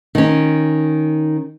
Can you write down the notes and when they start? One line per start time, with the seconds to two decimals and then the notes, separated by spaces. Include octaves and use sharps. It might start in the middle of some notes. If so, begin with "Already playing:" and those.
0.15 D#3 C#4